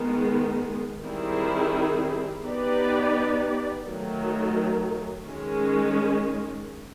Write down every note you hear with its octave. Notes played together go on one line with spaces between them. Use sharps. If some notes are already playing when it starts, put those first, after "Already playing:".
Already playing: D#3 G#3 B3
D#3 G3 C4 E4 G#4
B3 D#4 G4 B4 D5
D#3 F#3 A3
D#3 G#3 C#4